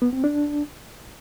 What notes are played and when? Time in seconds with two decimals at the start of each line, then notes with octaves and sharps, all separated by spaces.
0.02 B3
0.13 C4
0.24 D4